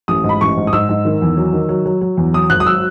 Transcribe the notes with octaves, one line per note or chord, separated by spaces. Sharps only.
A1 D#6
G#2
B5
A1 C#6
G#2
D#6
G#2 E6
G#2
D#3
E2
F#3
D#3
F#3
F#3
F#3
E2
F#3 D#6
G#1 F#6
D#6
F#3 E6